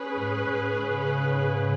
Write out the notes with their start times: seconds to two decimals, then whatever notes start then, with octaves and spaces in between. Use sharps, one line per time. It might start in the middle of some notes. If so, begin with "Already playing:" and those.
Already playing: C#4 G#4 B4
0.15 G#2
0.45 G#2
0.75 G#2 C#3